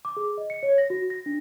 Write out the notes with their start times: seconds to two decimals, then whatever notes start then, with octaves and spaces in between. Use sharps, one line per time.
0.05 D6
0.17 G#4
0.38 D#5
0.50 C#7
0.63 C#5
0.78 A#6
0.90 F#4
1.10 A#6
1.26 D4